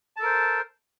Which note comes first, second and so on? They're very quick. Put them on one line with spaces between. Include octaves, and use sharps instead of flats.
A5 A4 A#4 C5